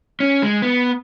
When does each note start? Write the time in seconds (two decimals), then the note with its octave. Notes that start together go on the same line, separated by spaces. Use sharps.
0.20 C#4
0.42 G#3
0.62 B3